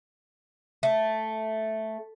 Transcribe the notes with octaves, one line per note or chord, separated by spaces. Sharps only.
A3